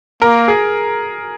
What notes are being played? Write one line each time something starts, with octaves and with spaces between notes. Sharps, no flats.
A#3 A#4
G#4